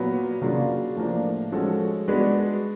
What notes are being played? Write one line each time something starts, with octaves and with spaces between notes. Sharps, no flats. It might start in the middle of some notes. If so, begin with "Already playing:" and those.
Already playing: A#2 F#3 B3
C#3 F#3 A#3 D4 F4
A2 F3 A#3 D4
F3 G#3 C#4 F#4 A4
G#3 B3 D4 F#4